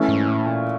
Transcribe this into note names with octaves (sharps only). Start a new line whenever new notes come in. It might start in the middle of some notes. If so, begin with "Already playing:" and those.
Already playing: E3 A3 C#4
G#2
A2
A#2